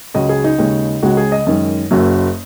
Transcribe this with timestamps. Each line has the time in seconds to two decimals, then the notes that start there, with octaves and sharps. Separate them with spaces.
0.14 C#2 C#3 F#3 D#5
0.29 G#4
0.44 D#4
0.58 D#2 C#3 G#3
1.03 C#2 C#3 G#3 F#4
1.17 G#4
1.32 D#5
1.47 F#2 D#3 G#3
1.91 F#1 F#2 F#3